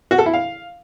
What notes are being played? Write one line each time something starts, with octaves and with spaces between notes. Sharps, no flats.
F#4
A4
E4
F5